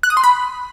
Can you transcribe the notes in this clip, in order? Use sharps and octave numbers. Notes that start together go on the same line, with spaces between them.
F#6
D#6
C6
B5